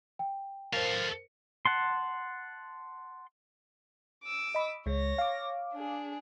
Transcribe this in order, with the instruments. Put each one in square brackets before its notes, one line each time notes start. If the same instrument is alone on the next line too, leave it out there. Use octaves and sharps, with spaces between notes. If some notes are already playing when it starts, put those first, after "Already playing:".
[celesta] G5
[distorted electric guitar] A4 F5 [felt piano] A#4 C5
[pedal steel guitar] F#5 A5 C6
[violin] D6 E6
[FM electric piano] D#5 B5
[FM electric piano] C#2 G#3 [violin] C#5 A#6
[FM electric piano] F5 D6
[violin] D4 G#4